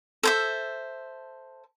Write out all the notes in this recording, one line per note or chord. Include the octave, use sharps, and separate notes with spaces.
A4 C5 E5